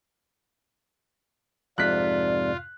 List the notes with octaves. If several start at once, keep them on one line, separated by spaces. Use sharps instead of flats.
F2 G#2 C3 F4 D5 F#6 B6